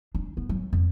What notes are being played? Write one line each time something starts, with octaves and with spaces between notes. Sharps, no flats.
D4
B3
F#3
F2